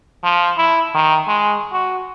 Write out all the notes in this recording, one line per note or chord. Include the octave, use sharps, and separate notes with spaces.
F3
E4
D#3
G#3
F#4